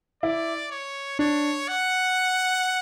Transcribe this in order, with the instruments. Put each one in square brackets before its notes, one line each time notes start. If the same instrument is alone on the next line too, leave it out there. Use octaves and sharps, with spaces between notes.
[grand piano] E4 [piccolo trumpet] D5
[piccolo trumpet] C#5
[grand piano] D4 [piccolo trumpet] C#5
[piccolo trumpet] F#5